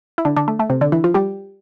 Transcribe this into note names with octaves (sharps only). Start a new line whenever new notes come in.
E4
D3 D4
D3 D4
A3
A3
C3 C4
D3 D4
E3 E4
F3 F4
G3 G4